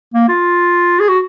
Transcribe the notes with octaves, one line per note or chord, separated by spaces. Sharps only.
A#3
F4
G#4
F#4